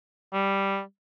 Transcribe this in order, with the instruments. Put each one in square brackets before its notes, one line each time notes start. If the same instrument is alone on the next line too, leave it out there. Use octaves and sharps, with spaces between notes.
[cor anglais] G3